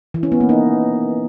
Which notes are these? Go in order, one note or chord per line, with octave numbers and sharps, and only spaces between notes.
E3
C#4
B3
A#3
D#4